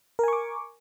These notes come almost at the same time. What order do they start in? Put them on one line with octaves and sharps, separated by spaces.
A#4 G#5 C#6 D6